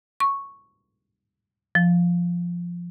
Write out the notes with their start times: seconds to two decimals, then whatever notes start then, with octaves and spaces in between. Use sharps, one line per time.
0.20 C#6
1.75 F3